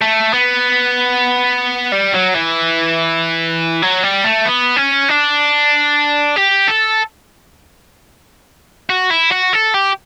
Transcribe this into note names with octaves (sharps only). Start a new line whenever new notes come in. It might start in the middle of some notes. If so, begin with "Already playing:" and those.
A3
B3
G3
F#3
E3
F#3
G3
A3
B3
C#4
D4
G4
A4
F#4
E4
F#4
A4
G4